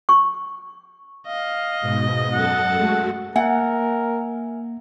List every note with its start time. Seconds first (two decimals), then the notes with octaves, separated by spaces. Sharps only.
0.09 C#6
1.27 D#5 F5
1.81 G#2 B2
2.32 F#2 A4 F#5 A6
2.75 G#3 A3 F#4
3.36 A#3 A#4 E5 F#5 G#5